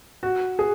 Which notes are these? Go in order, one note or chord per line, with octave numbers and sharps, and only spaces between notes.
F#4
G#4